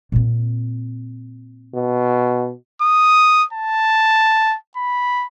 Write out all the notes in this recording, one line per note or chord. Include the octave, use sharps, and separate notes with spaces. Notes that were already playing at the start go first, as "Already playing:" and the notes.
A#2 C4
B2
D#6
A5
B5